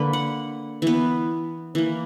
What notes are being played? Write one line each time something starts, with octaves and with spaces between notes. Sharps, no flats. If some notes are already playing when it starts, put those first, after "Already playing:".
Already playing: D3 A#3 B4
F#5
E3 B3
E3 A#3